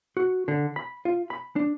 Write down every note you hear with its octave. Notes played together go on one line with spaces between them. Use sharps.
F#4
D3
B5
F4
B5
D4